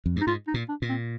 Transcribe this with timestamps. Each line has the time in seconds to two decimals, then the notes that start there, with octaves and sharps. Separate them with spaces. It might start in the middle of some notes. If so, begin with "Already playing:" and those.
0.06 F2
0.16 G2
0.21 D#4
0.27 G#2 F4
0.47 D#4
0.54 A#2
0.69 D4
0.82 A#2
0.89 C4